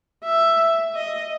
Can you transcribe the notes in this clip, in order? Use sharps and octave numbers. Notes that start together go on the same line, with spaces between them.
E5
D#5